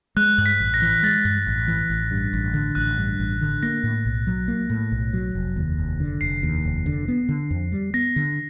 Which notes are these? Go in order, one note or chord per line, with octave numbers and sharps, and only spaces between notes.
G#3 F#6
G2
B6
A1
A#6
E3
G#3 A6
G2
A1
E3
A1
G2
A1
D3
A1 F#6
G2
A1
D3
A#3 A#6
A2
B1
F#3
A#3
A2
B1
F#3
F1
D#2
F1
D3
F1 C7
D#2
F1
D3
B3
D3
F2
G3
B3 A#6
D3